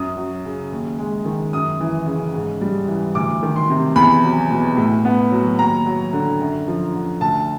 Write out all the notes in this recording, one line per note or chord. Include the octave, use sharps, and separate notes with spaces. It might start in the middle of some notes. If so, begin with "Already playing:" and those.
Already playing: F#2 D#6
F#3
C#3
D#2
G#3
D#3
F#2 D#6
E3
C#3
G#2
G3
E3
D2 D6
D#3
C6
C3
E2 B5
F#3
B2
A2
B3
F#3
D#2 A#5
F#3
D3
F#2
F3
D3
D2 A5